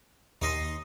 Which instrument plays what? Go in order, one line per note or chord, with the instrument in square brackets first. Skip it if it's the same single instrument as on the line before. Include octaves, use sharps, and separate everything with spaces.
[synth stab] D#2 [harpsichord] D#4 D#5 C6